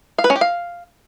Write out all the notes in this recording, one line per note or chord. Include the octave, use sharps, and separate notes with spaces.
F5
B4
C#4
G4
F5